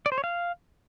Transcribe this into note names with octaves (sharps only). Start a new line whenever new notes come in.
D5
C5
C#5
F5